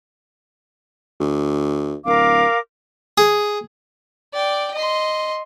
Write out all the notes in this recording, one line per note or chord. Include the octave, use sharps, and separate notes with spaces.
D2
D1 A#4 F5 D6
G#4
D5 G5
D#5 C6